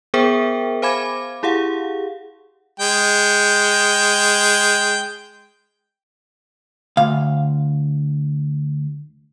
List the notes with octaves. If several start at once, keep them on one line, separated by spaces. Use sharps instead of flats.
B3 G#4 A#4 C5 E5 G5
C5 F5 G#5 B5 D6 G#6
E4 G4 G#4 F5 F#5
G#3 G5
D2 F5